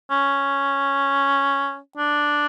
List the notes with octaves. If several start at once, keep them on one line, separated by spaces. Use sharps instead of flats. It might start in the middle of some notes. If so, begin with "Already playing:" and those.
C#4
D4